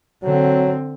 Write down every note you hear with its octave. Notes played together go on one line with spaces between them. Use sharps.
D3 F#3 C4